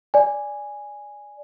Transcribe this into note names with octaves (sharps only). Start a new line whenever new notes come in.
D5 G#5